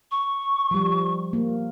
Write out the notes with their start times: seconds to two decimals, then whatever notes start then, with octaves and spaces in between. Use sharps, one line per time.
0.11 C#6
0.71 F3 G3
1.33 A#3